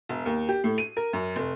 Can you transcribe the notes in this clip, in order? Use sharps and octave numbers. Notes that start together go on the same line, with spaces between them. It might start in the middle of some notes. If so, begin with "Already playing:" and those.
E1
D#2
G4
A2
D#7
A#4
F#2
F1